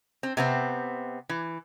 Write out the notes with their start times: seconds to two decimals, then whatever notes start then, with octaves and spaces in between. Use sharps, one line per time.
0.23 C4
0.37 C3 B3 C4
1.29 E3